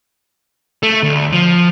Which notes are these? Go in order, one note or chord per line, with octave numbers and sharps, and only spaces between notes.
A3
D2
F3